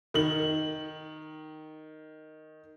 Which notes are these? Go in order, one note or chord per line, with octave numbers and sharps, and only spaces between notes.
D#3 F#7